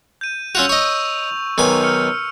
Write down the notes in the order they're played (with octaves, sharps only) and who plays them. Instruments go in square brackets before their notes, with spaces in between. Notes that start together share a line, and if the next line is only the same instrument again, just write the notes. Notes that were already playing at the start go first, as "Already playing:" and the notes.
[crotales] G6 D#7
[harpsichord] C#4 F4 F#4 [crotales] E6 F7
[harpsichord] C#5 D#5 [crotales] C#6 E6
[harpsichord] B1 D#3 G#5
[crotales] F6 C#7